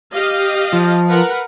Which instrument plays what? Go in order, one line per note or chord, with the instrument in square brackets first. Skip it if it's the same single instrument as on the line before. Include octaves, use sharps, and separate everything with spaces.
[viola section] G4 D#5 F5
[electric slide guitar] F3
[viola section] A#4 B4 F#5